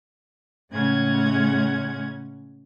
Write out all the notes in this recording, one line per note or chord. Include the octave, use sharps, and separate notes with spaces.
A2 C#3 G#3 C#4 F#5 G#6